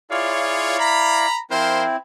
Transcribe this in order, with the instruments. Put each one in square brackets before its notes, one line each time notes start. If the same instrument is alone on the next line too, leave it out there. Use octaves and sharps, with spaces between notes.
[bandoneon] E4 D5 F5 [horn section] F4 G#4 C#5
[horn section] A#5 B5
[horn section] F3 A#4 C5 [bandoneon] C4 E4